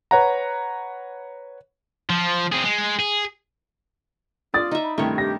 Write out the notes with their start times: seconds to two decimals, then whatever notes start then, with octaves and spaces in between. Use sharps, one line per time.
0.11 B4 C#5 F#5 A#5
2.10 F3
2.52 C4 G#4
2.64 G#3
2.99 G#4
4.54 F4 D5 D#6 A6
4.71 D#4 E5
4.83 B5
4.98 G2 C3 D#3 A3 E4 C#5
5.18 G4 A#6